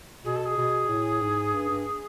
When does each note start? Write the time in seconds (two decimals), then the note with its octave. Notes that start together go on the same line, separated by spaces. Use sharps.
0.24 B2 G#4
0.35 A4
0.45 G#4
0.57 B2
0.89 A2
1.21 G#2
1.53 G2
1.69 G2